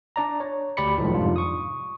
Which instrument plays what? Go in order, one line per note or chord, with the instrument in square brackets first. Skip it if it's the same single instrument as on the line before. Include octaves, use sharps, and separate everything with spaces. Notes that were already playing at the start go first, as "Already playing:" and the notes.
[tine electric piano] D4 D5 A#5
C#5
D2 G4 D5 B5 C#7
C2 A2 D#3 F3 F#3 G#3
F2 G#2 C3 G3 D4 F4
C#6 D#6